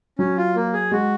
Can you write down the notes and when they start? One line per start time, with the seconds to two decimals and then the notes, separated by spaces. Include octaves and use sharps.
0.19 F#3 C#4
0.37 F4
0.56 A#3
0.73 G#4
0.91 G#3 F#4